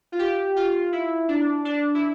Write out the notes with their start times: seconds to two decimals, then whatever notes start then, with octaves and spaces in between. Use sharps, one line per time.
0.12 F4
0.19 G4
0.56 F4
0.92 E4
1.28 D4
1.65 D4
1.95 E4